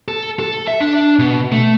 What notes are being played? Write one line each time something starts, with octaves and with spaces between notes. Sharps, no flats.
A4
A4
E5
D4
B2
A3